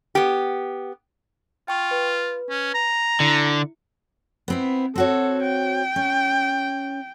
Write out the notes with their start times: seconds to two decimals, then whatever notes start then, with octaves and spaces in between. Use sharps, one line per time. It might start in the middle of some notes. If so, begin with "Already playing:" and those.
0.15 B3 G4
1.68 F4 G5 C#6
1.91 B4
2.50 C#4
2.74 A#5
3.20 D3 E4
4.48 B3 C4 E4
4.96 C4 F#4 A4 C#5
5.42 G5
5.96 C#4